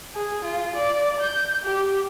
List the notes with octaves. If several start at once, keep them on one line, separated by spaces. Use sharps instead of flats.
G#4
F4
D5
G6
G4